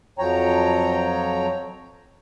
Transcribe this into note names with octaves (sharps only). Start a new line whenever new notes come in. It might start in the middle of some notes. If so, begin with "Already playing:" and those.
F2 F3 F#3 C#5 G5 A#5